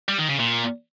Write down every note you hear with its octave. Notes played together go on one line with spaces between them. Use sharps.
G3
D#3
C#3
A#2